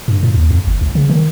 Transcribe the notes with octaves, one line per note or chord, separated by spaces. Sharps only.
G2
A2
D#2
F2
G1
C#2
C#3
D#3